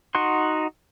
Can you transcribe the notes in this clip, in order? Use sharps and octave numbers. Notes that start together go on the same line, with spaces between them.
D#4 F#4 F#5 C6